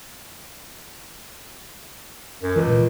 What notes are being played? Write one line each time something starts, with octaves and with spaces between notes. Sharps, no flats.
F#2
C#2 E3
A#2